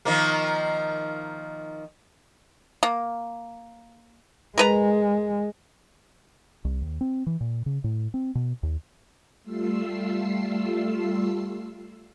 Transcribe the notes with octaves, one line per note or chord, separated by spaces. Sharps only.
D#3 F3 A#3
A#3
G#3 A#4 B4 A#5
C2
D#2
C4
E3
A#2
C#3
A2
C4
B2
D#2
G3 A3 F4 E6 C7